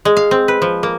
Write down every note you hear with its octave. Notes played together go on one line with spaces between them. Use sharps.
G#3
F5
C4
B4
F3
A#3